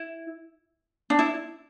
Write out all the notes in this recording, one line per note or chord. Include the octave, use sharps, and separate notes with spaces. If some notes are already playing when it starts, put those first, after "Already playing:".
Already playing: E4
D4
E4